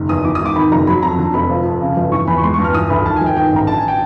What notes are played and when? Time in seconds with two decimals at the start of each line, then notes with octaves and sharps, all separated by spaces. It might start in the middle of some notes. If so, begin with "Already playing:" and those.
Already playing: F#1 D#3
0.09 E2 D#6
0.25 E3 D6
0.35 D#6
0.40 G#1
0.45 D6
0.56 D#3 B5
0.72 F#1 A#5
0.87 F#3 B5
1.03 F2 A#5
1.19 D3
1.34 F1 B5
1.50 F3
1.65 F2
1.81 C#3
1.96 G1
2.12 E3 C#6
2.28 E2 B5
2.38 C#6
2.43 G#3 C6
2.54 C#6
2.59 G2
2.64 F6
2.74 E3 D#6
2.90 D2 B5
3.06 D#3 A5
3.16 G#5
3.21 G1
3.26 G5
3.37 D#3 G5
3.52 A1 A#5
3.67 D3 A5
3.77 G#5
3.88 G5